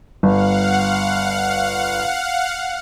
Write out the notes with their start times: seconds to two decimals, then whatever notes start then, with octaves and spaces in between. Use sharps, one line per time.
0.23 G1 F5 F#5